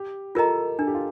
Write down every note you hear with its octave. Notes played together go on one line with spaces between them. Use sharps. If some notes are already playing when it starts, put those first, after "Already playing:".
Already playing: G4
F4 A4 A#4 D#5 A#5
D4 A4
G4
F4